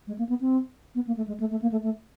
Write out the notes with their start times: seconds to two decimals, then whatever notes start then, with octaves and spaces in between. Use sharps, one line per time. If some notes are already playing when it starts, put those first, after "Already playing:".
0.07 G#3
0.19 A#3
0.29 B3
0.41 C4
0.95 B3
1.07 A#3
1.17 A3
1.28 G#3
1.40 A3
1.51 A3
1.62 A#3
1.72 A3
1.83 A3